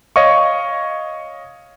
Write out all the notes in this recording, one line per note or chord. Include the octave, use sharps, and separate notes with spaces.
C#5 D#5 F5 C#6